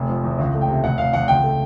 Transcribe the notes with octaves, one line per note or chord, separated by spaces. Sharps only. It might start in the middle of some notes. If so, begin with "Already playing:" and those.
Already playing: F1
F3
E2
C#2
A3
G5
C3
F1 F#5
F1 F5
E2 F#5
C#2 G5
A3